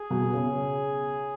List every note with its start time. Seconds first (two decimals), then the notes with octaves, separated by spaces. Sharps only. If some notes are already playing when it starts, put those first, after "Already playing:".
Already playing: G#4
0.10 B2
0.33 C#3